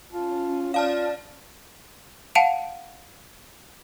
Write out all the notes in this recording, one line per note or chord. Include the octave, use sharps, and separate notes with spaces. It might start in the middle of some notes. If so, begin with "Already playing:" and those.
C#4 F4 A5
F4 D5 F5 A5 F6
F5 F#5 A5 D7 F7